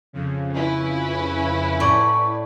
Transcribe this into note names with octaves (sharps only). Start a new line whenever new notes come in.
F2 C#3
C#4 E4 B4
A2 D5 C#6